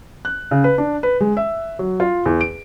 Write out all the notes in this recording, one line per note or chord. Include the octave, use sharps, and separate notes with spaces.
F#6
C#3
B4
D4
B4
G#3
E5
F#3
F4
E2
D7